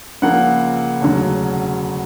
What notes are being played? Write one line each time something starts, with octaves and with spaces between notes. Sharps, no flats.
C#2 C#3 F3 A#3 F#5
E1 D2 C#3 F#3